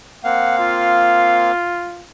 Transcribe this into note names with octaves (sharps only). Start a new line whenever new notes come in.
A#3 C4 F5 F#5
F4